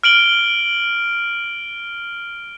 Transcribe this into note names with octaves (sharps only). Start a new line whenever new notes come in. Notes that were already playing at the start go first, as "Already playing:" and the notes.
F6 D7 F#7 G7